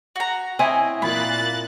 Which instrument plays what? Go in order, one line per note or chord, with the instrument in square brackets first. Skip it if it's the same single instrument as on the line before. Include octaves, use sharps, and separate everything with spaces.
[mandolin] F#4 A#5
[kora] C4 E4 C#5 [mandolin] D#5 G#5 D#6
[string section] A#2 F#6 A6 [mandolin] B5